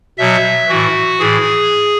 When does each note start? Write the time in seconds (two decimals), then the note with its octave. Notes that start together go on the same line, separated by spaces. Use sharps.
0.18 B2 F#3 E5
0.69 A2 E3 F#4
1.20 A2 E3 G#4